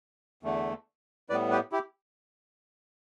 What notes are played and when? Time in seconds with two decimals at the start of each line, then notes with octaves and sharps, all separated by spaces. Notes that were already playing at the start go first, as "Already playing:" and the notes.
0.43 E2 D3 A3
1.29 A2 G3 B3 B4 D5
1.51 G4 B4
1.72 E4 G4